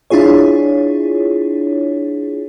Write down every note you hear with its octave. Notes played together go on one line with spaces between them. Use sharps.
D4 E4 F4 G#4 C#5